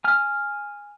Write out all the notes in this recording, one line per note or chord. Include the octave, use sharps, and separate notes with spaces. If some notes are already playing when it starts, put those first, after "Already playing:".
G#5 F6